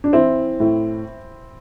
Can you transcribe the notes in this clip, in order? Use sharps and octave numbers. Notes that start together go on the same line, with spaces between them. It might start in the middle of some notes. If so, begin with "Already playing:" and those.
D4
E3 C4 E4
A2